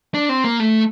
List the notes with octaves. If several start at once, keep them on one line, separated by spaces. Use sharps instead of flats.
D4
C4
A#3
A3